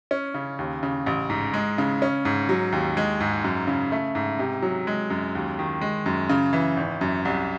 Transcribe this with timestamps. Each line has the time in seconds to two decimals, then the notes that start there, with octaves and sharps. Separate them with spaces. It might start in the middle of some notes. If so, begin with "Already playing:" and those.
0.11 C#4
0.34 C#3
0.59 D#2
0.83 C#3
1.06 A1
1.30 G#2
1.54 G#3
1.78 C#3
2.02 C#4
2.25 G#2
2.49 F#3
2.72 D#2
2.97 G#3
3.20 G#2
3.44 F#2
3.67 C#3
3.92 A3
4.15 G#2
4.39 C3
4.62 F#3
4.87 G#3
5.10 F#2
5.35 D#2
5.59 D#3
5.81 G#3
6.06 F#2
6.29 C#3
6.53 E3
6.77 G#1
7.01 F#2
7.25 C2